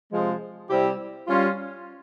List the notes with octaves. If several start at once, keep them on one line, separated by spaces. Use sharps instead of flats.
C3 F3 G#3
C3 G3 C4 E4 G4
G3 C#4 F4